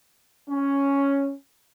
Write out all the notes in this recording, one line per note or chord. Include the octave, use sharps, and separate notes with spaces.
C#4